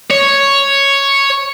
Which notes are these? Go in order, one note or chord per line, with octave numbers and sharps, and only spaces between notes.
C#5